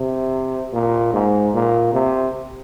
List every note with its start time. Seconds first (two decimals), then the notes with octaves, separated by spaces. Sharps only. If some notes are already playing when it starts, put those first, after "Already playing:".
Already playing: C3
0.73 A#2
1.13 G#2
1.54 A#2
1.93 C3